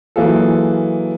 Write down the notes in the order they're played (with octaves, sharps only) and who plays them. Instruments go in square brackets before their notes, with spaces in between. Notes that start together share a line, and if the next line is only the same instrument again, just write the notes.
[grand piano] E3 F#3 A#3 F4 G#4 A4